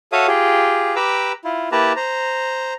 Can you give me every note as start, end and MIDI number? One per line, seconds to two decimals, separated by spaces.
0.12 0.27 66
0.12 0.27 69
0.12 0.27 73
0.12 0.27 76
0.12 0.27 77
0.12 0.27 87
0.28 0.95 65
0.28 0.95 67
0.28 0.95 68
0.96 1.32 67
0.96 1.32 71
0.96 1.32 82
0.96 1.32 86
0.96 1.32 88
1.44 1.69 64
1.44 1.69 65
1.72 1.93 58
1.72 1.93 64
1.72 1.93 67
1.72 1.93 71
1.72 1.93 81
1.72 1.93 82
1.96 2.74 72
1.96 2.74 82